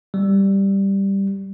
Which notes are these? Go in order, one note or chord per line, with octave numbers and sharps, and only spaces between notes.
G3